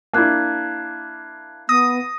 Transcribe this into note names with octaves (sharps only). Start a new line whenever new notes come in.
A#3 D4 E4 A5 F#6 G#6
B3 D#6 A#6